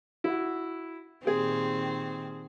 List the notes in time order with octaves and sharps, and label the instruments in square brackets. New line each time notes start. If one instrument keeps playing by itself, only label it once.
[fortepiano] E4 F#4
[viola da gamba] A#2 D#3 C4 [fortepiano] G4 G#4